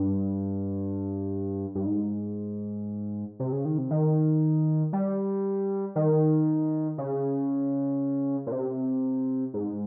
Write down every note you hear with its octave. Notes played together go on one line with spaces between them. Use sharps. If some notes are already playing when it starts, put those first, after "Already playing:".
Already playing: G2
G2
G#2
C3
C#3
D#3
C3
D#3
G3
D#3
C#3
A#2
C3
G#2